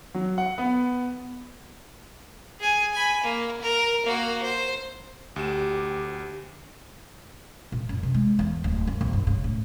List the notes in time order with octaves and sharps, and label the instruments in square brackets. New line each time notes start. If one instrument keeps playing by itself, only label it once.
[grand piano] F#3
F#5
B3
[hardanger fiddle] G#4 G#5
G#5 B5
A#3
A#4
A#3 F#4
C5
[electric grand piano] D2 E7 [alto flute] G4
[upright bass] A#2
F#2
C3
G#3
E2
D1
F#2
A#1
G2
C#3
A2